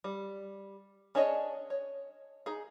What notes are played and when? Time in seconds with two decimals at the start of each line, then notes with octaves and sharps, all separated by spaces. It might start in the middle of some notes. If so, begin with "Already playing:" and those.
0.04 G3
1.15 C#4 D4 G#4 C#5 D#5
1.70 C#5
2.46 D#4 G#4